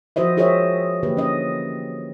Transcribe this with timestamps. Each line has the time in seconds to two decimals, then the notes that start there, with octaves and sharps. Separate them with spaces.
0.16 F3 F#4 C5 D#5 E5
0.37 F4 G#4 C5 C#5 D#5 E5
1.03 D3 E3 A#3 G4 B4
1.17 C#4 D#5